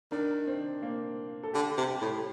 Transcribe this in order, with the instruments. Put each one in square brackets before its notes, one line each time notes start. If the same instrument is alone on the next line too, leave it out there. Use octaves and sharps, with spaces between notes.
[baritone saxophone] D#3 [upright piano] D4
[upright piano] C4
A#3
A4
[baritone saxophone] D3 [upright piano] G4
[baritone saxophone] C3 [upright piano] G4
[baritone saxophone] A2 [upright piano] G4